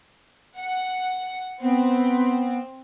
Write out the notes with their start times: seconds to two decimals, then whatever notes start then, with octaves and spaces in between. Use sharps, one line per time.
0.59 F#5
1.61 B3 C4